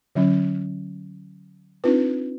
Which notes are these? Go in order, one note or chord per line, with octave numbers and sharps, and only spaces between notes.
D3 F#3 C#4
C4 D4 D#4 F4 B4